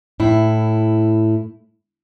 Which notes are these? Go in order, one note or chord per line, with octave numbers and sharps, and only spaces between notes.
A2 E4